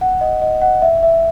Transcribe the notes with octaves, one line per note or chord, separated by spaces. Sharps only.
F#5
D#5
D#5
F#5
E5
E5